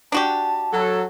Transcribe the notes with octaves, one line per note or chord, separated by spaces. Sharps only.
D4 F#4 G4 A5
F#3 A4